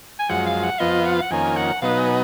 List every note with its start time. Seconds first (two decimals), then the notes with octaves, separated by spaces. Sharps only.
0.19 G#5
0.29 F#2 F3 G#3 F#5
0.46 F5
0.63 F#5
0.79 F2 F3 B3 F4 D#5
1.06 F#5
1.14 F5
1.22 F#5
1.31 F2 D#3 A#3 C#4 G#5
1.57 F#5
1.82 B2 F#3 B3 D#4 F5
1.98 G#5